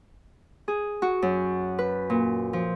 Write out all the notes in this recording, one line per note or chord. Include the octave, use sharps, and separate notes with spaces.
G#4
F#4
F#2
B4
A#2
F3